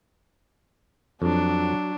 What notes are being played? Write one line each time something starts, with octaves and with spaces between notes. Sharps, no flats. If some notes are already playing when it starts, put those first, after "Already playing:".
F2 F#3 D4